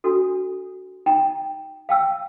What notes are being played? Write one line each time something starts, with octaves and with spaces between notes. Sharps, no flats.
D4 F#4 A4
D#4 G5 A#5
F5 G5 E6